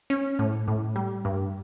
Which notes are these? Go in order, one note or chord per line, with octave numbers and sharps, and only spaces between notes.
C#4
A2
A2
G3
G2